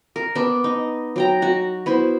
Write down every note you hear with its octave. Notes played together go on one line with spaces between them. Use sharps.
A#4
B3 D4
D#4
F#3 G5 A#5
F#4 F#5
B3 E4 C5